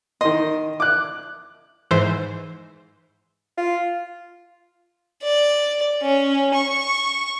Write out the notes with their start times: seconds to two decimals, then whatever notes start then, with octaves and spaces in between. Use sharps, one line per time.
0.21 D#3 D#5 C6
0.80 D6 F#6
1.91 G#2 E3 C5
3.57 F4
5.23 D5
6.02 C#4
6.55 C#6